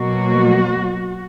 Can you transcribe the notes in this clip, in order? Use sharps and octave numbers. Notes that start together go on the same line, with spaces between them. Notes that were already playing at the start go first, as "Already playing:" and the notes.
Already playing: B2 F#3 A#3 F#4